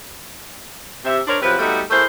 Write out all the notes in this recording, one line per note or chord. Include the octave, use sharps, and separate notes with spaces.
C3 E5
D4 A#4 C5 C#5
C3 F3 F#3 B4
G3 A3 B3 D#4 F#4 A4
A3 E4 G#4 A#4 C5